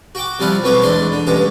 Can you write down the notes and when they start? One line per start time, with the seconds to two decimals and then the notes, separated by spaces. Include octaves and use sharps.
0.15 F#4 G5 D6
0.39 C3 F3 G3 E4 F5 F#5
0.64 B1 B3 C4 F#4 C#5 D6
0.82 E2 G#2 D4 E4 C6
1.12 D3
1.27 A1 G2 G#3 C#4 G4